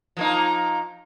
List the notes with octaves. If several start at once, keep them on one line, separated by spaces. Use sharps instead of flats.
F3 A#3 D#4